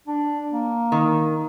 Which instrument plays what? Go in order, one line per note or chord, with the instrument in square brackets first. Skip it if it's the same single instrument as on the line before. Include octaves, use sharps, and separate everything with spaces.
[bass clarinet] D4
A#3
[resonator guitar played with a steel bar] D#3